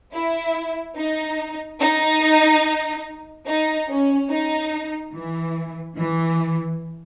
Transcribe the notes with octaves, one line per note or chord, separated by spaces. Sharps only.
E4
D#4
D#4
D#4
C#4
D#4
E3
E3